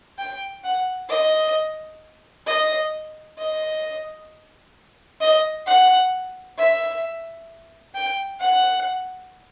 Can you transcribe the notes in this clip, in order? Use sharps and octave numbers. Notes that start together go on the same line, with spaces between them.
G5
F#5
D#5
D#5
D#5
D#5
F#5
E5
G5
F#5